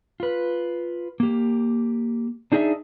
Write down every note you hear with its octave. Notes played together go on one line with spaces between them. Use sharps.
F4 B4
A#3 G4
D4 D#4 G#4 A4 D#5 E5